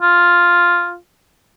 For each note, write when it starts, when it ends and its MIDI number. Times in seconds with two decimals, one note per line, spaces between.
0.02 0.96 65